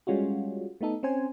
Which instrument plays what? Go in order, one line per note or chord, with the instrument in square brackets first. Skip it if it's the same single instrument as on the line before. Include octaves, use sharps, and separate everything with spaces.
[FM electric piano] G3 G#3 C#4 F4 F#4
A3 B3 D#4 A4
C4 C#4 C5 G#5